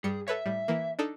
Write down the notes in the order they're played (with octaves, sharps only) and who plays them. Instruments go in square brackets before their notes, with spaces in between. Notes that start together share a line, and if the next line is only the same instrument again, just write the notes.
[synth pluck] G2 G3 C#7 [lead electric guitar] G#4
[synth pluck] A4 B4 C#5 [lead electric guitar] E5
[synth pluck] A2 G3
E3 A#3
D4 D#4 A4